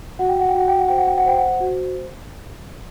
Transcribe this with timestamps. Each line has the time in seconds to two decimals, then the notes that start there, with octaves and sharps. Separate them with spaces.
0.19 F#4 F#5
0.29 G5
0.40 F#5
0.49 G5
0.55 F#4 F#5
0.68 G5
0.79 F#5
0.88 C5 G5
0.98 F#5
1.07 G5
1.18 F#5
1.26 C5 G5
1.38 F#5
1.60 F#4